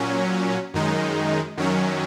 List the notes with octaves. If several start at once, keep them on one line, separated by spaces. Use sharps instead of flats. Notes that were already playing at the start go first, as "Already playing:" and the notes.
Already playing: A#2 F#3 C#4
F#2 D#3 G#3 D#4
F#2 D#3 F#3 C#4